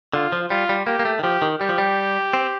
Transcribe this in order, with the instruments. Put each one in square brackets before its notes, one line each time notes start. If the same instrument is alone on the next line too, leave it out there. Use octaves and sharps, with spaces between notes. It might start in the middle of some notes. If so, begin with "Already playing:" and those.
[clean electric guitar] D3 [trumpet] F4
[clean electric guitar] F3
[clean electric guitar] G3 [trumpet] F4
[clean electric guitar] G3
[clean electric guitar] A#3 [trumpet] G4
[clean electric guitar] A#3
A3
D#3
[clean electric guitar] F3 [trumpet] G4
[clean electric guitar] D#3
[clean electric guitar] G3 [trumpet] G4
[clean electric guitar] F3
G3
C4